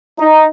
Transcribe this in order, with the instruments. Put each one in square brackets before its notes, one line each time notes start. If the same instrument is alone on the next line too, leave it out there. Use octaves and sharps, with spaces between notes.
[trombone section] D#4